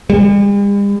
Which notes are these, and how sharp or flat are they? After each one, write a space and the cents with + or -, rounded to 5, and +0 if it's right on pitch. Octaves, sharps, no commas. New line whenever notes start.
G3 +45